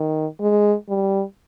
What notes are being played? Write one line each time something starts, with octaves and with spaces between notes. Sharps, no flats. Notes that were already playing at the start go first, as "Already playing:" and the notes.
Already playing: D#3
G#3
G3